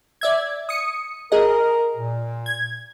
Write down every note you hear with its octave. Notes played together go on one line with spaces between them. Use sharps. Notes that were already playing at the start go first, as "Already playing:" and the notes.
D5 E5 G#6
D#6 C#7
G#4 A#4 D#5
A#2
G#6